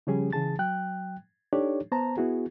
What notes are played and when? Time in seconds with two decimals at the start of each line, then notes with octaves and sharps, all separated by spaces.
0.07 C#3 F3 G3 C#4 G4 G#4
0.33 C#3 E3 G#4 A5 A6
0.59 F#3 G5 F#6
1.53 D4 D#4 G4 A4 C#5 D5
1.92 B3 C5 A5 A#5
2.17 B3 E4 F#4 G#4